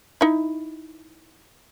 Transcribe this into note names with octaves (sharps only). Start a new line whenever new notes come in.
D#4 E4